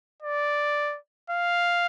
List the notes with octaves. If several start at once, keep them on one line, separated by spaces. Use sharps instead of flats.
D5
F5